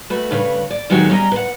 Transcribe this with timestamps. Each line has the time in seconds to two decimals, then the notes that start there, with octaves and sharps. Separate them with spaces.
0.10 A3 F#4 B4
0.31 G2 C#3 B4 C#5
0.71 D5
0.90 D#3 F#3 G#3 B3 F#4 G4
1.09 G3 C#4 D#5 A#5
1.32 B4 F#5